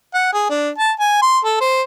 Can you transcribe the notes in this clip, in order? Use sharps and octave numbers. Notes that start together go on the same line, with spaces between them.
F#5
G#4
D4
A5
G#5
C6
A4
C5